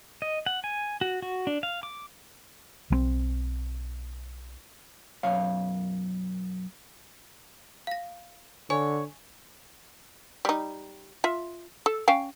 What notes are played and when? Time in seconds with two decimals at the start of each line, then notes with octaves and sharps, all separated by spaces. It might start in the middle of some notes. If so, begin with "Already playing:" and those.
0.22 D#5
0.46 F#5
0.64 G#5
1.01 F#4
1.22 F#4
1.47 D4
1.63 F5
1.83 D6
2.90 B1 F#3 C4
5.23 B1 F#2 C#5 F5
7.87 F5 A#6
8.70 D3 C#5 G#5
10.45 G3 D#4
11.24 F4 E5
11.86 A4
12.08 C#4 F5 G5